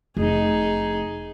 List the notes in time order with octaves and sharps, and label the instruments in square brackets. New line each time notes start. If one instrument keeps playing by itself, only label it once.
[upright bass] F1 [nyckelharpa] D#4 G#4